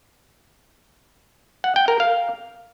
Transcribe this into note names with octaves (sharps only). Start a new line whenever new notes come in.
F#5
G5
A#4
F5